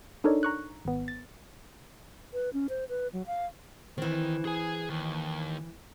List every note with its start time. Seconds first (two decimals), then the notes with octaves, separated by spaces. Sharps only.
0.24 D4 D#4 A4 A#4 C#5 D5
0.43 A#5 C#6 F#6
0.85 G#1 B3
1.08 A6
2.33 B4
2.53 C#4
2.69 C5
2.89 B4
3.13 F#3
3.27 F5
3.98 D#3 E3 C4
4.45 G#4 G#5
4.90 D#2